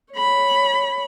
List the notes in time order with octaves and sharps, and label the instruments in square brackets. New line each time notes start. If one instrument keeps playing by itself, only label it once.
[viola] C#5 B5